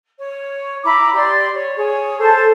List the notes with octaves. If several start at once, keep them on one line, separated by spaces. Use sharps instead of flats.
C#5
E4 A#5 B5 D6
G4 D5 C6
C#5
G#4 C#5
A4 C5 A5